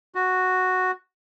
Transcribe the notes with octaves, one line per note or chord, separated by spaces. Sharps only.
F#4